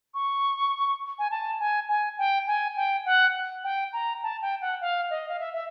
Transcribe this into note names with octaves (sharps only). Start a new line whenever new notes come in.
C#6
G#5
A5
G#5
G#5
G5
G#5
G5
F#5
G5
A#5
A5
G5
F#5
F5
D#5
F5
E5
E5